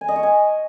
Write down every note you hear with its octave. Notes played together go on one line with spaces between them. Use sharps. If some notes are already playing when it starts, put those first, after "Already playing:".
G#5
D#5
C#6
G#5